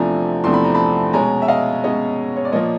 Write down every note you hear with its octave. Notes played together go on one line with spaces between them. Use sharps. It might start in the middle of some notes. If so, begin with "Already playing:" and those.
Already playing: E2 C3 F3 A3 D4 G#5 A#5
E2 C3 F3 A3 D4 C6
B5
A#5
A5 B5
B2 G#3 C#4 G#5 A#5
E5
D#5 F5
B2 G#3 C#4 C#5 D#5
C#5
D5
A#2 F3 A#3 C#5 D#5